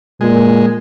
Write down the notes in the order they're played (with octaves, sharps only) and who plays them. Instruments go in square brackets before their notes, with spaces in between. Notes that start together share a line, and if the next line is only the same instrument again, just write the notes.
[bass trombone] A#2 [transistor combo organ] G#3